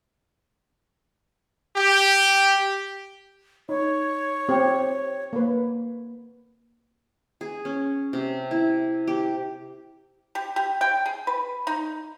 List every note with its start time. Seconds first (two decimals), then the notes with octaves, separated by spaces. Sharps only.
1.76 G4
3.69 D#4 C#5
4.49 C4 G4
5.33 A#3 B4
7.41 G#4
7.65 C#4
8.13 C3
8.51 E4
9.07 G4
10.35 G4
10.56 G4
10.81 G5
11.06 G#4
11.27 B4
11.67 D#4